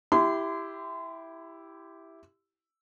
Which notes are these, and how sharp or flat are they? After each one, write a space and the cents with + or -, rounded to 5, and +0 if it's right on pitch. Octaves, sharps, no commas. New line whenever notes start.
E4 +0 G4 +0 C6 -35